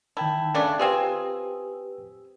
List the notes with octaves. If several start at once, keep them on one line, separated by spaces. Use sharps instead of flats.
D#3 E4 G5 A5
C#3 A3 D4
C4 F4 G4 G#4 B4 E6